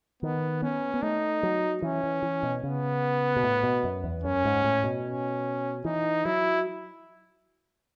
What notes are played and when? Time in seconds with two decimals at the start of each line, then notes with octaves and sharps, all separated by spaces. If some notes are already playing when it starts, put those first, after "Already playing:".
0.23 D#3 B3
0.62 B3 C#4
0.94 B3
1.03 A3 D#4
1.43 F#3
1.82 E3 C#4
2.04 E3
2.23 E3
2.43 B2
2.63 C#3 B3
3.37 B2
3.43 A2
3.63 B2
3.84 F#2
4.04 E2
4.24 F#2 C#4
4.45 G#2
4.64 A2
4.84 B2
5.05 C#4
5.85 E3 D#4
6.25 F#3 E4